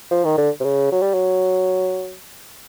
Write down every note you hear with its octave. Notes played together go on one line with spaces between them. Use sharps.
F3
D#3
D3
C3
C#3
F#3
G3
F#3